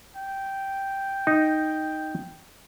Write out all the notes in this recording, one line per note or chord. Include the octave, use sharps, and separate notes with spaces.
G5
D#4